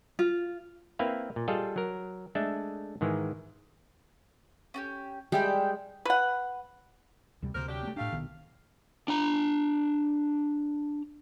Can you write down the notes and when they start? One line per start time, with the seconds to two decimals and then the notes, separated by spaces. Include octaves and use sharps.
0.19 F4
0.99 A#3 C4 E4 B4 E5 F5
1.36 A#2
1.48 G3 F4 G#4 A4 D#5 F5
1.76 F#3 A#4
2.35 G#3 A3 D4 A4 E5
3.01 G#2 D#3 E3 G#3
4.74 C#4 F#4 G4
5.32 G3 G#3 G4 E5 G5
6.05 B4 F#5
7.42 D2 C3 G3
7.55 D2 C3 A#3 A#4 C5
7.68 F#3 D4 G4
7.83 A3 B3
7.97 A2 A3 D4 G4 F5
8.13 B1 D#3 B3
9.08 D4 A#5